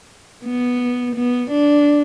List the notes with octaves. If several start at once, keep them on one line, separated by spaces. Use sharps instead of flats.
B3
B3
D4